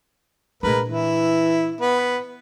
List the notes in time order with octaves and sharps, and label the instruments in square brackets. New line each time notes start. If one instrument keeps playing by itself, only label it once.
[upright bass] A#2 D4 [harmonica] G#3 A#4 B4
[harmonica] E3 E4
B3 B4